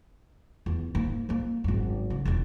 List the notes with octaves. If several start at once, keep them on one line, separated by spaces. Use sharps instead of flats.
E2
G#2 A#3
F3 A#3
G#1 F#2
C#3
E1 E2